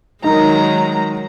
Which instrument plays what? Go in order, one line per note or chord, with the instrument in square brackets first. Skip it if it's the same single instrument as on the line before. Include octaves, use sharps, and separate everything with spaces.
[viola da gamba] D#3 F#3 G#3 [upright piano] D#4 A#4 [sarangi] A#5